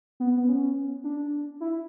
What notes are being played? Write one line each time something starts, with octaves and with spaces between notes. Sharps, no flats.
B3
B3
C#4
D4
E4